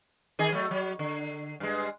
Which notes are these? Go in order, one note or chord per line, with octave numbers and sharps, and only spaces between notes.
D#3 G#4 D#5
F#3 A3
F#3
D3
G2 G#3